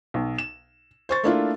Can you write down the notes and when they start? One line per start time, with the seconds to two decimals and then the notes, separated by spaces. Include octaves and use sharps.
0.14 B1
0.38 E7
1.09 C5 C#6 A6
1.24 A3 A#3 D4 E4 F4